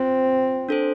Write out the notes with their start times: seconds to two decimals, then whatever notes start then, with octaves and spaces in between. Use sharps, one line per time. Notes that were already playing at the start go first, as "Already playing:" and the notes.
Already playing: C4 F4 C5 G5
0.69 D4 A4 C5